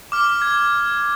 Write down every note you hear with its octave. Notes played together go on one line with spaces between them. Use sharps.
D6 F6
G#6